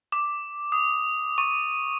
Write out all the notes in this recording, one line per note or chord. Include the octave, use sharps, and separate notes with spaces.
D6
D#6
C#6